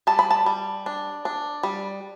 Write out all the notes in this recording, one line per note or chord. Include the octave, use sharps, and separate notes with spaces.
G3 A5
B5
A5
G3
D4
D4
G3